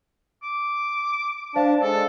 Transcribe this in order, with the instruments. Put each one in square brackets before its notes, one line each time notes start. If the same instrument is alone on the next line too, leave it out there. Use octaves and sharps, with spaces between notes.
[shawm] D6
[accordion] D4 A5 [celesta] C5 F5
[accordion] G#3 [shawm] A4